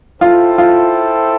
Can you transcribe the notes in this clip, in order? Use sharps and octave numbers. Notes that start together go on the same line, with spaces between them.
E4 F4 A4 C5 G5
F4